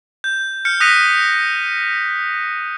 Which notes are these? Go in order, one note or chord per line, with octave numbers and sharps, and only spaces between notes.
G6
F6 G6 C#7
D#6 F#6 A#6 B6 C#7 D#7